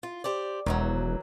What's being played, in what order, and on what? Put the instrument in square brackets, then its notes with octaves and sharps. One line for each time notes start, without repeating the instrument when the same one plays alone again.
[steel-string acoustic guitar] F4
G4 C5 D5
[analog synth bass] E1 [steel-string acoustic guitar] D#3 E3 F#3